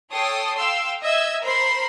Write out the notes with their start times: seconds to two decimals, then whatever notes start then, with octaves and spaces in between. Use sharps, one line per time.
0.11 A4 C#5 G5 D#6 C7
0.57 F5 G5 C6 E6
1.02 D#5 E5 E6 G#6
1.42 A#4 C5 B5 C6 C7